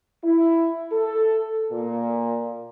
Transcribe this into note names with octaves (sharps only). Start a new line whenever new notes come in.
E4
A4
A#2